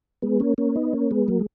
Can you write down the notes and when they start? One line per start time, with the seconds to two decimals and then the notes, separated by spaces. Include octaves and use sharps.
0.22 G#3 B3
0.40 A#3 C#4
0.58 A#3 C#4
0.76 B3 D#4
0.93 A#3 C#4
1.11 G#3 B3
1.28 F#3 A#3
1.40 G#3